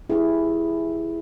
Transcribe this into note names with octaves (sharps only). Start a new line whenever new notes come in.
E4 G4 G#4